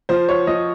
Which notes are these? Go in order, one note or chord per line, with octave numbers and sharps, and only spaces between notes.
F3 C5
C#5
F3 D#5